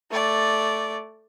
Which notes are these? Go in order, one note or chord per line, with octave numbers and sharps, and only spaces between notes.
A3 D5